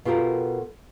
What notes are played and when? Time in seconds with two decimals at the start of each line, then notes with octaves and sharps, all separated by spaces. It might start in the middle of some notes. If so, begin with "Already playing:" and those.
0.05 B2 F4 G4 A4 A#4